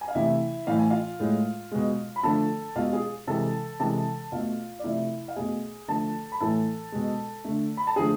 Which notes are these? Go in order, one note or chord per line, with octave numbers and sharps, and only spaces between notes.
G#5
F5
C3 E3 A3 E4 E5
A2 E3 A3 F5
G#5
F4 F5
A2 G#3
B2 G#3
B5
D3 F3 A3 A4 A5
B2 G#3 F4 F5
G#4 G#5
C3 E3 G#3 A4 A5
C3 E3 G#3 A4 A5
B2 A3 F4 F5
D5
C3 F3 A3 E4 E5
F5
B2 A3 G#4 G#5
D3 F3 A3 A4 A5
B5
A2 E3 A3 A4 A5
B2 G#3
D3 A3
B5
A5
D3 F3 A3 G#4 G#5